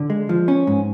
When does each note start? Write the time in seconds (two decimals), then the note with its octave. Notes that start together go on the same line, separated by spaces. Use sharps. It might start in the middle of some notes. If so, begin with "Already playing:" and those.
Already playing: D3
0.10 G#3
0.29 F3
0.48 C#4
0.67 G#2